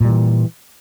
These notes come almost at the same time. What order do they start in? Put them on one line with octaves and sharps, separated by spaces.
A#2 G3 E3